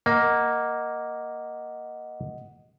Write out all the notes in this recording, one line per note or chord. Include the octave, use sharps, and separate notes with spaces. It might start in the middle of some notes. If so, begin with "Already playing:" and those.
A#3 D#5 F#5